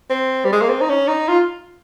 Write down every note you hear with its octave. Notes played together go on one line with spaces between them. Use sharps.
C4
G3
G#3
A#3
C4
D#4
C#4
D#4
F4